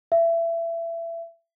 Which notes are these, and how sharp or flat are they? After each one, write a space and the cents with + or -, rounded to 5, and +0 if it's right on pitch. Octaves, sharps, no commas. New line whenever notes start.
E5 +25